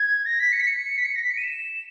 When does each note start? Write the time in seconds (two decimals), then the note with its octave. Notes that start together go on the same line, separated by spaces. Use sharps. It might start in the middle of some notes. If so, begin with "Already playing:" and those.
Already playing: G#6
0.25 A#6
0.39 B6
0.52 C#7
0.60 B6
0.66 C#7
0.97 B6
1.04 C#7
1.15 A#6
1.22 B6
1.30 C#7
1.37 D#7
1.43 E7